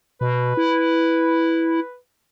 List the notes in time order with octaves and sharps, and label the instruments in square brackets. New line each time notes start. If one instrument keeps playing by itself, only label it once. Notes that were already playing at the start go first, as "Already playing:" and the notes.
[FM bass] B2 [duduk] B4
[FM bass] E4